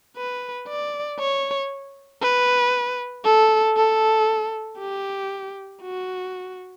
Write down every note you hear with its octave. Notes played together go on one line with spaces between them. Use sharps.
B4
D5
C#5
B4
A4
A4
G4
F#4